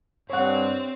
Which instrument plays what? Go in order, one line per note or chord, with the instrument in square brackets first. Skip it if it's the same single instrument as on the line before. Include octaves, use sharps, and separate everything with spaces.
[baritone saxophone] G2 [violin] C4 [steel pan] C#5 F#5